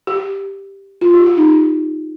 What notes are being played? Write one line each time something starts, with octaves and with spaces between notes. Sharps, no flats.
G4
F4
G4
G4
D#4